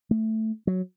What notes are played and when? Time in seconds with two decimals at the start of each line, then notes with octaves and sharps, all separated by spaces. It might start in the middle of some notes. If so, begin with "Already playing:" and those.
0.11 A3
0.67 F#3